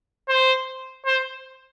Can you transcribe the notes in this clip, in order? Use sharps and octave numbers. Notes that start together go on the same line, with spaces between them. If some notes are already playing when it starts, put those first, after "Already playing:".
C5
C5